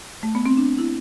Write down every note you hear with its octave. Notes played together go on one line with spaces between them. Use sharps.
A3
B3
C4
D4
E4